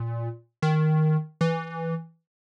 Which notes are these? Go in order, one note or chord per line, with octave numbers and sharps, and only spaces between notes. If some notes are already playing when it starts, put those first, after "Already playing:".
Already playing: A#2
D#3
E3